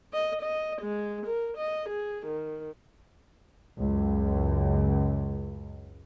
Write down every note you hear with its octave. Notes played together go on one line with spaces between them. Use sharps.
D#5
D#5
G#3
A#4
D#5
G#4
D#3
C#2 F#2